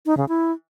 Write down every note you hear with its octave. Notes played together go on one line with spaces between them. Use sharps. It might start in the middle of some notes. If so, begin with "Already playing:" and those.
D#4
C#3
E4